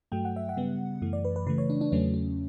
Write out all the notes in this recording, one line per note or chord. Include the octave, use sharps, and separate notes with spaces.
G2 F#3 A3 G5
F#5
E5
F#5
C#3 G3 B3
F#2 E3 A3
D5
B4
B4
C#3 E3 A3 B4
C#5
D4
D4
E2 C#3 F#3 A3 C#4
C#4